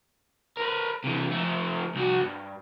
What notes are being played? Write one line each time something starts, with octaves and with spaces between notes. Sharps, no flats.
A#4 B4
C3 E3
F3 A3
C2 F#4
G2